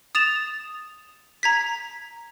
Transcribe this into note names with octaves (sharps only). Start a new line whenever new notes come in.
D#6 A6 E7 F7
A#5 G#6 B6